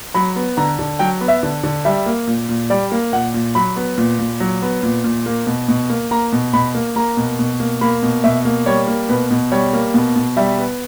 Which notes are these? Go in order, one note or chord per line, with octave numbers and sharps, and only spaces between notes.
F#3 B5
B3
D3 A#5
D3
F#3 G5
B3
E5
D3
D3
G3 E5
A#3
A#2
A#2
G3 D5
A#3
A#2 F#5
A#2
F#3 B5
B3
A#2
A#2
F#3
B3
A#2
A#2
A#3
B2
B2
A#3
A#3 A#5
B2
B2 B5
A#3
A#3 A#5
B2
B2
A#3
A#3 B5
B2
B2 E5
A#3
G3 C#5
A#3
B2 B4
B2
G3 C#5
A#3
B2
B2
G3 E5
B3